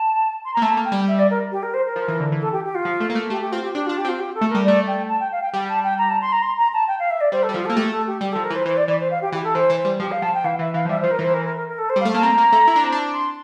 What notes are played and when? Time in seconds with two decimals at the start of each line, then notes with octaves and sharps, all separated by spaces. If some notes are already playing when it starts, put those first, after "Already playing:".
Already playing: A5
0.44 C6
0.53 A#3 A#5
0.62 A3 A5
0.77 A#3
0.85 G5
0.92 G3
1.07 E5
1.18 D5
1.30 A#4
1.51 G4
1.62 A#4
1.73 C5
1.85 A#4
1.96 F3
2.08 E3
2.20 D3
2.32 E3
2.40 A4
2.52 G4
2.64 G4
2.74 F4
2.85 F3
3.00 A3
3.10 A#3
3.15 A3
3.30 A3 G4
3.41 G4
3.52 C4 F4
3.64 G4
3.75 D4 G4
3.86 F4
3.89 D4
3.97 G4
4.05 C4
4.08 F4
4.19 G4
4.34 A4
4.41 A3
4.49 A#4
4.55 G3
4.63 A3 D5
4.87 G5
5.08 A5
5.20 G5
5.31 F5
5.41 G5
5.53 G3 G5
5.68 A5
5.83 G5
5.98 A#5
6.09 A5
6.21 C6
6.32 A#5
6.42 C6
6.57 A#5
6.73 A5
6.87 G5
6.99 F5
7.10 E5
7.20 D5
7.32 G3 C5
7.43 A4
7.49 G3
7.54 F3 F4
7.65 A4
7.69 A#3
7.76 A3 G4
7.91 A4
8.07 G4
8.21 G3 G4
8.32 A4
8.35 F3
8.43 A#4
8.50 E3
8.54 C5
8.65 E3 C5
8.77 D5
8.88 E3 D5
8.99 C5
9.10 F5
9.21 G4
9.32 E3 G4
9.43 A4
9.54 E3 C5
9.70 E3
9.77 C5
9.85 G3
10.00 F3 G4
10.11 F5
10.22 F3 A5
10.34 G5
10.44 E3 F5
10.59 E3 E5
10.74 E3 F5
10.85 F3
10.89 G3 E5
11.01 C5
11.03 F3
11.11 A#4
11.19 E3 C5
11.33 A#4
11.45 A#4
11.56 A#4
11.67 A#4
11.78 A4
11.89 C5
11.96 G3
12.00 F5
12.05 A3
12.12 A#3 A5
12.22 C4 A#5
12.38 A#3
12.52 A3
12.67 E4
12.76 D4
12.84 C4
12.92 D4
13.13 C6